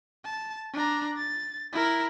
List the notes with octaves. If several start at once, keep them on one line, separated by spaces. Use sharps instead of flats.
A5
D4 A#5
A6
E4 A#4